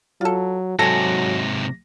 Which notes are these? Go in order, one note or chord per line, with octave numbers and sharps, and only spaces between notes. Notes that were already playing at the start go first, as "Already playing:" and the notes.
F#3 F4 A4
G#2 C3 F#3 A4 G#5 A#6